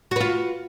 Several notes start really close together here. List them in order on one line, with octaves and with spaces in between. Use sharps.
F#4 B4 F4